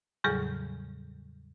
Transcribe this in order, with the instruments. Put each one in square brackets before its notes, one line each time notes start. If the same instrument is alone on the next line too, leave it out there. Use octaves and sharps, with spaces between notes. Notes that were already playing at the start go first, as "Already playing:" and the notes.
[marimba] E2 A2 C#3 F#3 G3 G#4